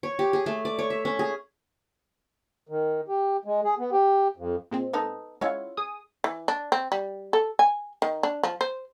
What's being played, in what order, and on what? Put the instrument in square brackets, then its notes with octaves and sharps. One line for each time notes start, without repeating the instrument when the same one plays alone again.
[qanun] C#5
G4
G#4
A3
D5
C#5
E5
C#4
G#4
[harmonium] D#3
G4
G#3
G#4
B3
G4
F2
[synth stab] A#2 G#3 C4
[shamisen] B3 D#4 A4
[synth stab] G#3 E4 F4 [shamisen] C#4 C#5 F#5
[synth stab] G#4 D#6
[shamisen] E3
D4
C4
G3
A4
G#5
D#3
D4
F3
C5